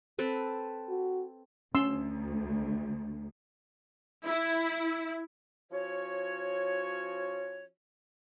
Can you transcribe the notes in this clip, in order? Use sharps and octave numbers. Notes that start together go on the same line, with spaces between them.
C4 A4 B4
F#4
D2 C#4 C6 E6
E4
F3 C#4 F#4 C#5